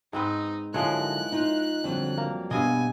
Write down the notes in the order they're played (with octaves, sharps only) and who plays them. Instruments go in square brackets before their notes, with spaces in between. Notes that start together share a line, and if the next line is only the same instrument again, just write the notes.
[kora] G#2 C4 B4 [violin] D#4
[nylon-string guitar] D3 F#3 [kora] F3 G#3 C#5 [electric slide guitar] E4 A#4 [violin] F#6
[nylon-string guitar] D#4 F4
[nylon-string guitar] F2 F#3 G3 [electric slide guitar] D3
[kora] A#3
[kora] G2 D#5 [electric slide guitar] B2 B3 [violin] G#5